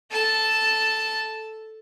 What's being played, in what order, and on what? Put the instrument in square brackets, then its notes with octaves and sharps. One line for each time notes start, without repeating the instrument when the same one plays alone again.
[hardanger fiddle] A4 A5